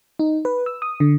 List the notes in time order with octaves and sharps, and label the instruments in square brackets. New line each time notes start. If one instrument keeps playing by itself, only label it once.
[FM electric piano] D#4
B4
E6
D#6
D3